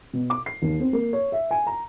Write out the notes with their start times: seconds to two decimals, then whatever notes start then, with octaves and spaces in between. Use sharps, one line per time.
0.13 B2
0.30 D6
0.46 C7
0.62 D#2
0.80 C4
0.93 A#3
1.13 C#5
1.32 E5
1.51 G#5
1.67 A#5